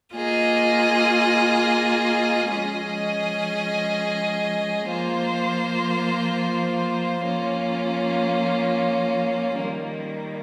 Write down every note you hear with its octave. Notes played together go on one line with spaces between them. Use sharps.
A#3 F4 G#4 D#5
F3 G#3 C#4 G#4 D#5
F3 A#3 F4 C5
F3 A#3 C#4 F4
D#3 G3 A#3